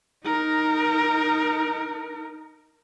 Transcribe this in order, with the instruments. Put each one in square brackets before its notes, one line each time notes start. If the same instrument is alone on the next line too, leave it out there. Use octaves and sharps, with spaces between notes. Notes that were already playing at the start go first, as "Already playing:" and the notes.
[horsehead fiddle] D#4 A#4